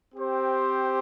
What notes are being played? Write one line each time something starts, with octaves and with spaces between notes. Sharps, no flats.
C4 G4 C5